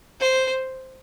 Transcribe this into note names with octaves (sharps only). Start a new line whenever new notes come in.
C5